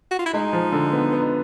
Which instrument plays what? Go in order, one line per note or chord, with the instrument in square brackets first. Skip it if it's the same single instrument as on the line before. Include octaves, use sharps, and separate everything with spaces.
[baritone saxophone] F#4
F4
E4
[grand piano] G#3 [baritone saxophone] D#4
[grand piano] F3
D3
B3
B3